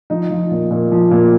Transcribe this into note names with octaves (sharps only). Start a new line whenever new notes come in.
F3 D#4
F3
A#2
A#2
F3
A#2